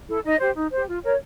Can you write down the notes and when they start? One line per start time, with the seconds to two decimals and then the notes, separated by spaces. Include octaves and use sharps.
0.08 E4 A4
0.24 D#4 D#5
0.40 G4 C5
0.56 D#4
0.72 G4 C5
0.88 F4
1.04 A#4 C#5